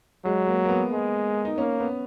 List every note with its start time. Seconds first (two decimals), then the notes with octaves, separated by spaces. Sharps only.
0.25 F#3 G#3
0.47 A#3
0.64 A#3
0.69 B3
0.91 G#3
1.45 D#4
1.58 A#3 C#4
1.80 B3